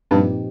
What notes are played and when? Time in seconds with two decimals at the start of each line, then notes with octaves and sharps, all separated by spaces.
0.11 G2 A#2 F3 C4 D#4 G4